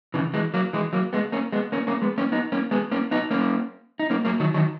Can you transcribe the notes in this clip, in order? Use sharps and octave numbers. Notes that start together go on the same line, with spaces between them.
C#3 E3
E3 G#3
F#3 A#3
E3 G#3
F#3 A#3
G#3 B3
A#3 C#4
G#3 B3
A#3 C#4
A#3 C#4
G#3 B3
A#3 C#4
B3 D#4
A#3 C#4
G#3 B3
A#3 C#4
B3 D#4
A#3 C#4
D#4
A#3 C#4
F#3 A#3
D#3 F#3
D#3 F#3